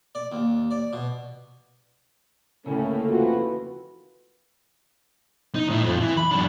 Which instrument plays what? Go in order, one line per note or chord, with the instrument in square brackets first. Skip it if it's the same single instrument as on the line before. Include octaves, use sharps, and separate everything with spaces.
[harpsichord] D5
D#2
D5
B2
[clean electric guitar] D2 C#3 [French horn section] A2 C#4 [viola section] A3 A#3 [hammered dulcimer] A4
[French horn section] F2 F4 F#4 [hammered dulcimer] E3
[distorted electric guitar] D#4
A2
F2 F3
E3
B5
F#2 D4